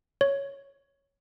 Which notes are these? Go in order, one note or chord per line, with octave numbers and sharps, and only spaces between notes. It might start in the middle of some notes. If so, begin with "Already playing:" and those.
C#5